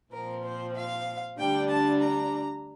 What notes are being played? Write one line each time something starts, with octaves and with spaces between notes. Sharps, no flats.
A#2 F3 C4 A#4
C5
F5
D2 D3 G3 D4 G5
A5
A#5